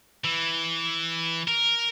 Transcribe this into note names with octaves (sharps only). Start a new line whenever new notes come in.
E3
A#4